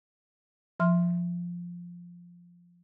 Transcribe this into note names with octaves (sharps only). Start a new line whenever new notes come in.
F3 E5 C6 F6